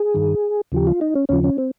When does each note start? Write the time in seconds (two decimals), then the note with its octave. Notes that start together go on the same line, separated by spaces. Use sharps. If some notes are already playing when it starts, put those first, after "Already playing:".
Already playing: G#4
0.14 G2 D#3
0.72 D#2 C#3 F3 G4
0.87 F4
1.01 D#4
1.15 C#4
1.29 D#2 C#3 F3 C#4
1.44 C#4
1.58 C4